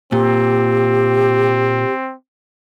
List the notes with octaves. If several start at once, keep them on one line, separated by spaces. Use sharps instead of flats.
A#2 C4 G4